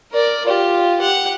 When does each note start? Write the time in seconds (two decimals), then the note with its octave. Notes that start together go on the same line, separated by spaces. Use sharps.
0.12 A#4 D5
0.46 F4 G4
1.00 G4 F#5